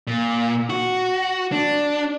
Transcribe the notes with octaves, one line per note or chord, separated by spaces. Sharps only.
A#2
F#4
D4